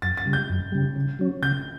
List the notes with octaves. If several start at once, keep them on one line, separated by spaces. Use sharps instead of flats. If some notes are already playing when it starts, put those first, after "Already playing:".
F#2 A6
A6
C#3 G3
G6
F#2
C#3 G3
C#3
F#3 C#4
C#3 G6